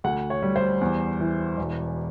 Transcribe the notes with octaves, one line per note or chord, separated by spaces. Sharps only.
D2 F#5
C#5
G3
C5
E2
E3
E1